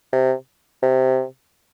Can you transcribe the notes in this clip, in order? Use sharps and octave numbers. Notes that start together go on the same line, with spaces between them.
C3
C3